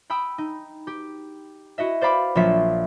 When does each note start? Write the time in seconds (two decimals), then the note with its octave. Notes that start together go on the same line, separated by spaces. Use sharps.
0.10 G5 B5 D#6 E6
0.38 D#4
0.87 G4
1.78 E4 F#4 D#5 E5
2.01 C5 D5 F5 B5 D6
2.35 A#1 F#3 F4 E5 B6